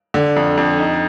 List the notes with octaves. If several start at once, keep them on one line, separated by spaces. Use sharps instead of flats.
D3
F2
F2
D#4